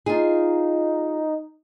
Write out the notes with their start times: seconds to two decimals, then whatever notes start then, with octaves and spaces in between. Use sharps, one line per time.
0.06 D#4 F4 G#4